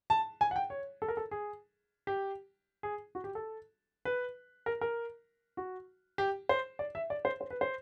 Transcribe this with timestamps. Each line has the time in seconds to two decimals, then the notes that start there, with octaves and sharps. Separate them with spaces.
0.10 A5
0.41 G#5
0.51 F#5
0.56 G5
0.70 C#5
1.02 A4
1.08 A#4
1.17 A4
1.31 G#4
2.07 G4
2.83 G#4
3.15 F#4
3.24 G4
3.35 A4
4.05 B4
4.66 A#4
4.81 A#4
5.57 F#4
6.18 G4
6.49 C5
6.79 D5
6.95 E5
7.10 D5
7.25 C5
7.41 C5
7.50 B4
7.61 C5